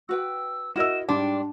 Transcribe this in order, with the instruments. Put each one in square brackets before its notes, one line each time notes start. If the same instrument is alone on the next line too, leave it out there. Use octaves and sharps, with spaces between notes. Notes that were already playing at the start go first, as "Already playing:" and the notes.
[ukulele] F#4 B4 G5 [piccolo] E6
[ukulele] E4 A#4 D#5 [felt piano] F#4 E6 [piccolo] E7
[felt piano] G#2 G3 C6 [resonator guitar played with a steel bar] D4 [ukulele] G5 [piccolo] D6